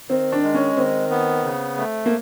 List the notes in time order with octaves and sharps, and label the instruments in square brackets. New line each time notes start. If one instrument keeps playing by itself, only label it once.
[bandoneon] D#3 [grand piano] C4
[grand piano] D4
[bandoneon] G#3
[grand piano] C#4
[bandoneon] D#3 [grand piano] C4
[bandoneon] B3
C#3
A3
[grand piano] A#3